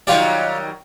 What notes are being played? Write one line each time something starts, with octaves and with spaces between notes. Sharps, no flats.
D#3 F#3 G3 F4 G4 D5